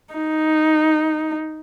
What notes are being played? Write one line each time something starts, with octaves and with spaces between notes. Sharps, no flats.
D#4